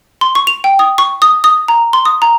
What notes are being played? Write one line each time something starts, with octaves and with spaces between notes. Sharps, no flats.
C6
C#6
F7
G5
D#6
C#6
D#6
D#6
A#5
C6
D#6
A#5